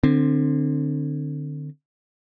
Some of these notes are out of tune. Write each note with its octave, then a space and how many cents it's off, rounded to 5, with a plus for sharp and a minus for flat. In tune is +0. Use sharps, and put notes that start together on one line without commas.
D3 +25 C4 +0